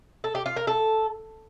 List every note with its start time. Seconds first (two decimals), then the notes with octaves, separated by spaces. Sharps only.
0.24 A4
0.35 G4
0.46 F4
0.56 A#4
0.67 A4